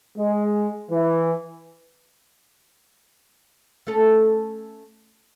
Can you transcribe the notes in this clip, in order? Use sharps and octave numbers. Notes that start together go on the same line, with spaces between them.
G#3
E3
A3 C#4 A4